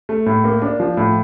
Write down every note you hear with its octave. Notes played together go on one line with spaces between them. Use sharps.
A3
A2
A#3
D4
F3
A2